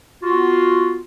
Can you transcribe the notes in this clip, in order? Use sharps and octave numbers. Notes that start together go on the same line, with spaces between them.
B3 F4 F#4